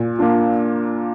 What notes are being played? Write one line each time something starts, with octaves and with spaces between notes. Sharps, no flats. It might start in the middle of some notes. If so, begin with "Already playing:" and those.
Already playing: A#2
A#3 D4 F4